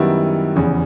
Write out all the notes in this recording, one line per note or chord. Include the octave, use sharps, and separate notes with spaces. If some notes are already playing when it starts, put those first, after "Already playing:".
Already playing: F#2 D#3 G3 B3 E4
F1 E2 C#3